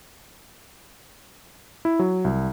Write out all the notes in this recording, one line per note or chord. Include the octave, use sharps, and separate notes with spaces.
E4
F#3
C2